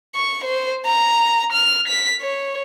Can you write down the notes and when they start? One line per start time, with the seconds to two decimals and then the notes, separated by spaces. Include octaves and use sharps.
0.15 C#6
0.44 C5
0.86 A#5
1.53 F6
1.88 B6
2.22 C#5